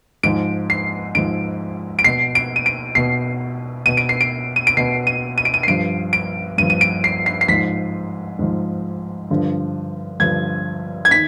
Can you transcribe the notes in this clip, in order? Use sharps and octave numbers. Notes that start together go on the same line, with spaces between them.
G#2 F3 D7
C7
G#2 F3 D7
D7
B2 C7
D7
D#7
D7
B2 C7
B2 D#7
D7
C7
D7
D#7
D7
B2 C7
D#7
D#7
D7
D#7
C7
G2 F3 D7
D7
G2 F3 D#7
D#7
D7
C7
C7
C7
G#2 F3 B6
G#2 F3
G2 D3 F3
G2 D3 F3 G#6
G#6
D#3 B6